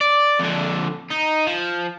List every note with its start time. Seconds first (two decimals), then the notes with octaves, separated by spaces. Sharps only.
0.01 D5
0.40 F2 D3
1.11 D#4
1.47 F3